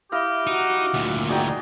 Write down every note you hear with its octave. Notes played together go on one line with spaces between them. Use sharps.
E4 G4 D#5 F5
D#4 F#4 F#5
D2 A#2
D#4 F#4 G#4 D5 G5